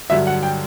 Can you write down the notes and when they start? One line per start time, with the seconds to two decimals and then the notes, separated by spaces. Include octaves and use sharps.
0.10 G2 D3 F#3 E5
0.27 F#5
0.43 G5